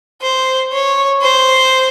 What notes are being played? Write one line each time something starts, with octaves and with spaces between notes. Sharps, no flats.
C5
C#5
C5